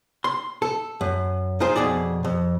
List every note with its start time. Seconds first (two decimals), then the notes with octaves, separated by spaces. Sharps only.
0.24 C6
0.62 A4
1.01 F#2
1.60 D#4 F4 G#4 C5
1.76 F2 B2 G#4 D5
2.24 F2